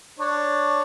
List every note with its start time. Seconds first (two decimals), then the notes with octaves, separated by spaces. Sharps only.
0.19 D4 C#5